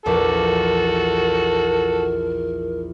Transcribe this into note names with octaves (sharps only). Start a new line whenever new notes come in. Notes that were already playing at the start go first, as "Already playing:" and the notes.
A#1 E2 F#4 A4 A#4 D6